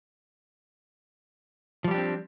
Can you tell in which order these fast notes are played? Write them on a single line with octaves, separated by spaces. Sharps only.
F3 G3 G4 D4 C4